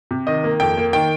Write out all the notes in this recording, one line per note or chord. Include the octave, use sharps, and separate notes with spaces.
C3
D#3 D#5
A#3
F2 G5
A#3
D#3 G5